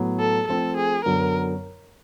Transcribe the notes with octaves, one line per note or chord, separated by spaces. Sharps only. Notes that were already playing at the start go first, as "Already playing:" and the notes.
Already playing: A2 F#3 B3
A4
F3 A3 C4 A4
G#4
F#2 D3 F#3 B3 A#4